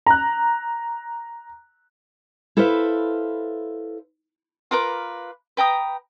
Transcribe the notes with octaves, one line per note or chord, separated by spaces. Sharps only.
A#5 F#6
E4 A4 B4 C5 E5 F5
F4 A#4 B4 D6
B4 G5 A#5 D#6